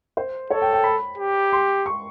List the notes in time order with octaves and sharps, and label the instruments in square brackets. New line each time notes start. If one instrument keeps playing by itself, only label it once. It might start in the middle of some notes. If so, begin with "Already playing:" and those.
[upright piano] C5
[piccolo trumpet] A4 [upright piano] C#5
[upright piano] G5
G5
B5
[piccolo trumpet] G4
[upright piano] C6
C#6